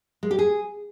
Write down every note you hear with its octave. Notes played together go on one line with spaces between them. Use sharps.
G#3
G4
G#4